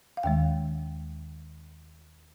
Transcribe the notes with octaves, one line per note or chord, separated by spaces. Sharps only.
F5
D#2 D#3 G#3 G5